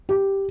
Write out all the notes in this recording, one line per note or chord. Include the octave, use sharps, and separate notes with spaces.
G4